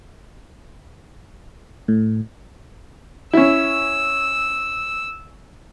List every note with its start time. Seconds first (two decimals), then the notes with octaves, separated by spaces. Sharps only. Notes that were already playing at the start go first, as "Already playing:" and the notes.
1.88 A2
3.33 C#4 E4 E6